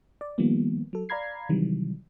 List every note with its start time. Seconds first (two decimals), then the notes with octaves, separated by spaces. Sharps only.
0.21 D5
0.38 D#3 F3 G3 A#3 B3
0.93 F#3 A4
1.09 D5 F5 A#5 B5 G#6 C7
1.49 C3 D#3 E3 F#3 G3